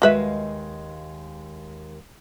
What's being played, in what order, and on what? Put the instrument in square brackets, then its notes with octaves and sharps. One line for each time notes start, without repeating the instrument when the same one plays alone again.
[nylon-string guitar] D#2 G#3 F5 [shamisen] F#4 B4 E5